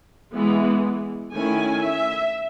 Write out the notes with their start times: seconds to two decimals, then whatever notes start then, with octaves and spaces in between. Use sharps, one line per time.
0.33 E3 G#3 B3
1.31 D#3 A3 C#4 E4 G#5
1.81 E5